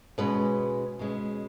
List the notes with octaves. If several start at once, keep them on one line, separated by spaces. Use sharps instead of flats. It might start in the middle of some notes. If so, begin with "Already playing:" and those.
B2 G#3 C#4 B4
B2 G#3 C#4